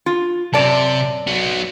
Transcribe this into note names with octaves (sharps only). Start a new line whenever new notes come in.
F4
F#2 C3 D5 A5
F#3 B3